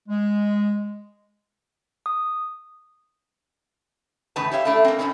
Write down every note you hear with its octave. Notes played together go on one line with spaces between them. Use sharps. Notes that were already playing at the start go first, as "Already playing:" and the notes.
G#3
D#6
E2 A2 C#3 D#4 B4 A5
G4 C#5 E5 F5
A3 D4 E4 A4
A#3 C4
F2 B2 D#3 C4 C#4 D#4